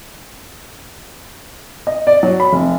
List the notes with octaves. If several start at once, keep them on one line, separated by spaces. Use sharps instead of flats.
D#5
D5
F#3
B5
F1